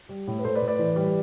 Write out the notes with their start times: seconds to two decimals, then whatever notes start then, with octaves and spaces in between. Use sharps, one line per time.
0.09 G3
0.27 A2
0.39 B4
0.44 A2 A4 C5
0.55 B4 D5
0.62 A2
0.68 B4 D5
0.79 E3
0.96 G3